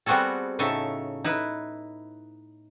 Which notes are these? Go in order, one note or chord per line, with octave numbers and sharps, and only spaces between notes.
G3 B3 C4 F#4 G#4 A4
A2 C#3 D#4 A4 E5 A5
D#4 E4 B4